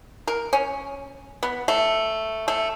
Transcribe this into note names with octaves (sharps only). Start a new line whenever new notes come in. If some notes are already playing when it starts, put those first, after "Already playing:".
A#4
C#4
B3
A3
A3